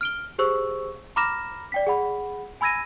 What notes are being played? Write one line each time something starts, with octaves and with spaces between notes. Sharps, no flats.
F6 D7 G7
G4 G#4 C5 C#6 E6
A#5 B5 D6 F6 A#6 E7
D5 G5 B6
G#4 F#5 B5
G#5 B5 E6 G#6 A#6 D#7